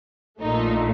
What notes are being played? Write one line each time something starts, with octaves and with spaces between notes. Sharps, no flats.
A#1 A#2 A3 D#4